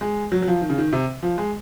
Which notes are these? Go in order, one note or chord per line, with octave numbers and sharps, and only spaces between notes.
G#3
F#3
F#3
F3
D#3
C#3
D#3
C3
F3
G#3